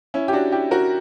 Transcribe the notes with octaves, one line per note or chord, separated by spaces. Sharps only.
C#4 E4
G4
D4 F#4
E4 G4
F#4 A#4